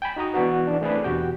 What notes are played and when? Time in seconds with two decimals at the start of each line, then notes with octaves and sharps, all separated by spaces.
0.02 G5 G#5 B5
0.16 D#4 F#4 A#5 D#6
0.34 E3 B3 D4 F#4 B4
0.67 E3 D4
0.81 A3 C4 D4 E4 G#4 B4
1.04 E2 B2 F#4 G4 G5